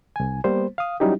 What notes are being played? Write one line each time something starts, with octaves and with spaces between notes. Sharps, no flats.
C2 G#5
G3 A#3 B3 C5
F5 D#6
F#3 G3 C#4 D#4 E4 G4